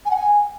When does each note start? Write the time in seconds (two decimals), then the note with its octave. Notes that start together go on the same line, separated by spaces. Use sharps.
0.05 G#5
0.10 F#5
0.15 G#5